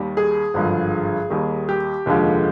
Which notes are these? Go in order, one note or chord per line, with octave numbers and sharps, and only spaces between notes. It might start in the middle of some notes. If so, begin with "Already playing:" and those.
Already playing: D#2 D#3 G3
G#4
G#1 G2 D3 F3
D#2 D#3 G3
G4
F1 D#2 D3 F3 G#3